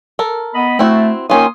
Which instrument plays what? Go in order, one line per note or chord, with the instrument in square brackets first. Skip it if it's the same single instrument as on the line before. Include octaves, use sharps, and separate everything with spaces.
[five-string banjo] A4 A#4
[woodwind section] B3 D#5 B5
[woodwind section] A3 [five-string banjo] C4 E4 F#4
[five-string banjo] D#3 C#4 F4 [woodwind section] A#3 C6 D#6